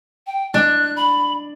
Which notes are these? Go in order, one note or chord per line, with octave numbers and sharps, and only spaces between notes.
G5
D4 F#6
B5